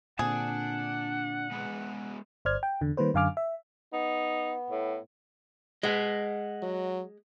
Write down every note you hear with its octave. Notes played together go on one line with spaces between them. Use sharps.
A#2 D3 C4 D4 G#4 F#5 A5
G#3 B3
G1 C5 D5 F6 G#6
G5
E2 D3
D#3 G3 A#3 B4 C5
F#2 D3 F5 G#5 D6 F6
E5
B3 D#4
A2
G#3 D#5 F#5
F#3